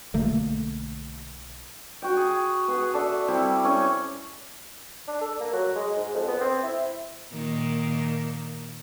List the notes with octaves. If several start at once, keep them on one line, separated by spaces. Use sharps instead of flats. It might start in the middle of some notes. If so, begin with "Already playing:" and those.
B1 D3 A3 A#3
F#4 G5
G#4
B3 G#4
A4 D5 E5 F#5
G3 C4 E4
C#4 C#5 G#5
D4
A4
A#3
F#3
G#3
G#2
F2
B3
C4
E4
A#2 D#3 A#3